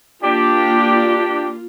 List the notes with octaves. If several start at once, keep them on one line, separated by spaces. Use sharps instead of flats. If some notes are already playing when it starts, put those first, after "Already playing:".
A#3 D4 F4 G4